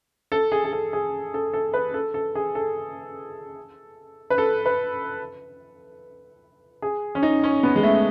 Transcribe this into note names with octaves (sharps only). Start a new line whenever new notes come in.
A4
G#4
G#4
A4
G#4
A4
A4
B4
A4
A4
G#4
A4
B4
A4
B4
G#4
C#4
D#4
C#4
B3
G#3
A3